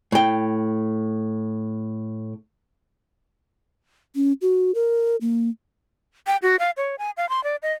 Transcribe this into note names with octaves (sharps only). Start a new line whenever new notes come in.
A2 G5
C#4
F#4
A#4
A#3
G5
F#4
F5
C#5
G#5
F5
C6
D5
D#5